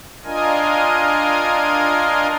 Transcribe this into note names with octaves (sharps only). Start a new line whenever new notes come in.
D4 F4 A#4 D#5 G#5